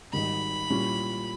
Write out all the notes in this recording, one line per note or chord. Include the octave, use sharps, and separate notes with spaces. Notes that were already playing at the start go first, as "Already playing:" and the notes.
G#1 G#2 D#3 G3 B5
A#2 G3 C#4 E4